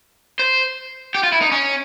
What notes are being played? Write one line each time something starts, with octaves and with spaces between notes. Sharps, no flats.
C5
G4
F4
E4
D#4
C#4